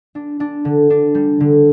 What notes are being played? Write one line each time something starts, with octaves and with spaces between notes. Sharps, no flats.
D4
D4
D3
D4
G3
D3